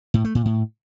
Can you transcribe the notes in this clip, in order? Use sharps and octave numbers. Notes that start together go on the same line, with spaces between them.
A2
A3
A#2
A2